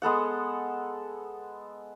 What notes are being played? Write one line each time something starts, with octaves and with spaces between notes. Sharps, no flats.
G#3 B3 A4 F#5